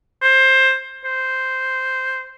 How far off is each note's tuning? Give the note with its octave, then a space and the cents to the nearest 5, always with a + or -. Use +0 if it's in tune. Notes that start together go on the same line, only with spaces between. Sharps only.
C5 +15
C5 -5